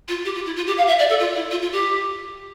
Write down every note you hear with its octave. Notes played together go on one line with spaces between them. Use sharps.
F4
G4
F4
E4
F4
G4
F5
E5
D5
A4
F4
E4
F4
F4
G4